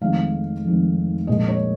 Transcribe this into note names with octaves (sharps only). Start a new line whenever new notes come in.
F1 F2 D#3 G#3 F5
F1 F2 D#3 G#3
A#1 A#2 G#3 D#5
C#5